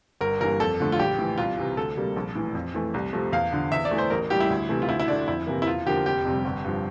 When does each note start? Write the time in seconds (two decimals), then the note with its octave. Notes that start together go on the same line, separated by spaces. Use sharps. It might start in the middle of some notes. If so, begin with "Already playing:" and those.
0.21 G1 A#4
0.40 G2 E3 A#3 A#4
0.60 F2 A4
0.80 D3 F3 A3
0.92 F4
0.99 A#1 G4
1.19 A2 E3
1.38 C2 F4
1.57 C3 E3
1.77 D2 A4
1.97 C3 G3 A#3
2.16 A#1
2.36 A2 E3
2.55 F2
2.74 E3 A3
2.94 C2
3.13 C3 F3 A3
3.33 E2 F5
3.52 D3 F3
3.72 E2 E5
3.85 D5
3.91 E3 A3
3.98 C5
4.10 A1 A#4
4.30 A2 G3 A#3 G4
4.40 E4
4.50 D2
4.69 C3 E3 A3
4.82 F4
4.89 D2 E4
4.99 E4
5.08 D3 A3 D4
5.28 F2 E4
5.47 C3 E3 A#3
5.62 E4
5.66 E2 F4
5.86 D3 F3 A#3 G4
6.06 F1 G4
6.25 F2 C3 G3
6.45 G1
6.65 G2 F3